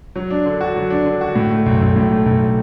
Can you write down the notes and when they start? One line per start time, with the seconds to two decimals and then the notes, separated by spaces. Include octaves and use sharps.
0.16 F#3
0.30 D4
0.45 D3
0.61 F#4
0.76 F#3
0.90 D4
1.06 D3
1.21 F#4
1.35 A2
1.51 A3
1.66 B1
1.81 B1
1.96 A2
2.11 A3
2.26 B1